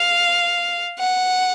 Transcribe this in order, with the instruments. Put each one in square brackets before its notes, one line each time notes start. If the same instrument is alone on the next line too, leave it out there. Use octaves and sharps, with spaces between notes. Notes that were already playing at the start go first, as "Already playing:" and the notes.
Already playing: [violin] F5
F#5